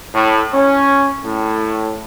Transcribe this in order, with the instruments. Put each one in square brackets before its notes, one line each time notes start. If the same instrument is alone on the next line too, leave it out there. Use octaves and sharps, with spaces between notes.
[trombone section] A2
C#4
A2